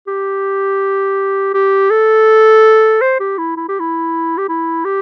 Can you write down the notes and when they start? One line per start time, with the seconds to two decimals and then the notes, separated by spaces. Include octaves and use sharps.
0.07 G4
1.54 G4
1.90 A4
3.01 C5
3.20 G4
3.38 E4
3.57 E4
3.68 G4
3.80 E4
4.38 G4
4.49 E4
4.85 G4